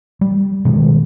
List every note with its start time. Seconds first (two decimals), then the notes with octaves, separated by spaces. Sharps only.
0.21 G3
0.65 B2 D#3 G#3